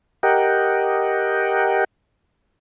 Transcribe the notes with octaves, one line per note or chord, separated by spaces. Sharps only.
G4 A#4 D#5 F#5 G5